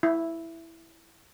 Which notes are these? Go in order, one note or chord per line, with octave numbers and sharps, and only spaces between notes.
E4